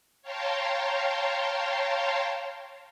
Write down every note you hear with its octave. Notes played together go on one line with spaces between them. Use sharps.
C#5 F5 G5 A5 A#5 C6